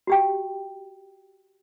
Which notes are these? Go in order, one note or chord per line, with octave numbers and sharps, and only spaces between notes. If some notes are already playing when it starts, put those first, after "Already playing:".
F#4 G4 G5